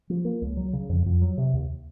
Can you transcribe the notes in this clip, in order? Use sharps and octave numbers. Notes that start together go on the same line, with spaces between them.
F3
A#3
C#2
F#3
C#3
F2
F2
F#3
C3
D#2